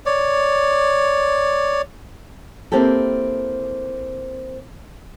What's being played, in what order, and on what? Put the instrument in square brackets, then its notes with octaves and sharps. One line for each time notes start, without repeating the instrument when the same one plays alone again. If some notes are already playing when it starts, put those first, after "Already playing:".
[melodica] C#5 D5
[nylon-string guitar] A#3 C4 E4 G4 A4